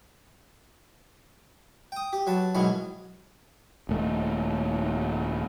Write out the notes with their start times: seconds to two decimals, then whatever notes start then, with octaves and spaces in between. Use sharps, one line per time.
1.92 G5 D#6
2.13 G4
2.27 F#3 B4 A5
2.55 G#2 B2 D#3 E3 F#3 B3
3.89 D#1 A3